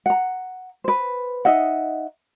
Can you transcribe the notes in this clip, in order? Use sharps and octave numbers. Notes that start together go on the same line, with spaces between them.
F#5 A#5
B4 C5
D#4 D#5 E5 F#5